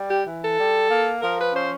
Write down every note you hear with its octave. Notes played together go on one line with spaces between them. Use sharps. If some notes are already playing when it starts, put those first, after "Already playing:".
Already playing: G3
G4
E3
A4
G3
A#3
F3 A#4
B4
C#4 C5